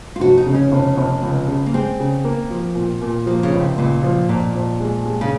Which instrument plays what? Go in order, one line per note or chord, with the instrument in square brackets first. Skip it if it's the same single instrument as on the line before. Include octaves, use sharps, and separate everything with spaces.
[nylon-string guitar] F4
[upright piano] F1 [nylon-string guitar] F#4
[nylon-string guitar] D#4
[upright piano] C#3
[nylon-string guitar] C#4
[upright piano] F1
F1
C#2
C#3
[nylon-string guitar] A#3
[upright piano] G#3 [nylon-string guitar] C4
[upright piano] C#3
A#3
F3
A#2
A#2
[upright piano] F3 [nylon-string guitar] A#3
[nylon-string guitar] C#3
[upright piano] C#2
[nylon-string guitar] C3
[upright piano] C#2 [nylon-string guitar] A#2
[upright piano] F3
[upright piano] F2 [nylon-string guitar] A#2
[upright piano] F2
G#3
G#3
[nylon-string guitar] C#3